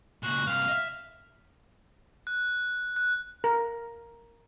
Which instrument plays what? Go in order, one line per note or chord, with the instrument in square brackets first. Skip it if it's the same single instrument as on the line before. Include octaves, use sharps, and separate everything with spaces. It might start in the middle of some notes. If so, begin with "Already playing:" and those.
[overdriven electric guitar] C#2 A#2 [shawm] F#4
[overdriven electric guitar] G2 C3 [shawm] F5
[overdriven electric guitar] D#5 E5
[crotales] F#6
F#6
[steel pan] A#4